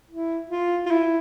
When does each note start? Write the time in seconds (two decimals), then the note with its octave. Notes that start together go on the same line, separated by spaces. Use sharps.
0.10 E4
0.50 F4
0.86 F4
0.91 E4